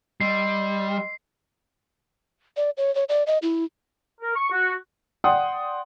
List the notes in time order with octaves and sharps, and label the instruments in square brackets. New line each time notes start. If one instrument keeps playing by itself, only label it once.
[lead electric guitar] G3 [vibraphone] D#5 C6 E6 [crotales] C7
[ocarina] D5
C#5
C#5
D5
D#5
E4
[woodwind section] A#4
C#6
F#4
[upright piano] D5 F#5 G5 C6 D#6